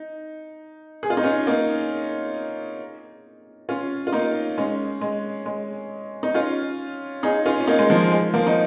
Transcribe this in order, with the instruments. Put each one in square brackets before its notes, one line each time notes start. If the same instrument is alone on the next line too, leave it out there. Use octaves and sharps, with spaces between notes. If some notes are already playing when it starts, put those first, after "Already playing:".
Already playing: [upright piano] D#4
G#4
F4
D#4
C#4 F4
A#3 D#4
C#4 F4
F4
A#3 D#4
G#3 C#4
G#3
G#3
D#4
C#4 F4
D#4 G#4
C#4 F4
C#4
A#3 D#4
G#3
F3
G#3
F3 A#3
D#4